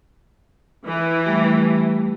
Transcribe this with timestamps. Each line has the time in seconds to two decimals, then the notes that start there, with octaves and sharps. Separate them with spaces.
0.87 E3
1.26 G3 A3 G4